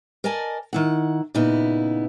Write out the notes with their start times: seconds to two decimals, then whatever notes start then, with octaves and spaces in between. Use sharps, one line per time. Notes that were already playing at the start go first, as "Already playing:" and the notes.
0.24 A#4 D5 D#5 G#5 A5
0.73 D#3 E4 F#5
1.34 A#2 C#3 B3 D#4 E4